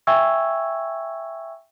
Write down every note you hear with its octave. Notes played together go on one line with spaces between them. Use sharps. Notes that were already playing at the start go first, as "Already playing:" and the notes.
E5 G5 G#5 C#6 E6 G#6